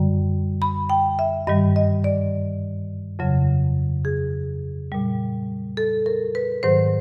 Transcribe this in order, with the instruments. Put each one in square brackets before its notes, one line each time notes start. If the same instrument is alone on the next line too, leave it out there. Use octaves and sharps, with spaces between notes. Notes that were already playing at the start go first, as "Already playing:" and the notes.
Already playing: [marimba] F#2 D3 G3
B5
G5
E5
G2 D#3 G3 D#5
D#5
D5
F2 C#3 F#3
G#4
A#2 G3
A4
A#4
B4
G#2 D#3 F#3 C5